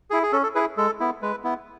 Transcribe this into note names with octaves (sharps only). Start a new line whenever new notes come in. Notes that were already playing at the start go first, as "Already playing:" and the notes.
E4 G#4
G#4
C#4 A4
A4
E4 G#4 B4
G#3 A4
B3 E4
G#3 B4
B3 E4